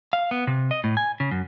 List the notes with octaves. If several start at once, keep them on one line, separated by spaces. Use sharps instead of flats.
F5
B3
C3
D#5
A2
G#5
C#3
F#2